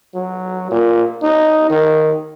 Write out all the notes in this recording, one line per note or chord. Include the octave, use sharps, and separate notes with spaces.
F#3
A#2
D#4
D#3